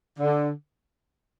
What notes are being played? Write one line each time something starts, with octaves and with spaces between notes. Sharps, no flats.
D3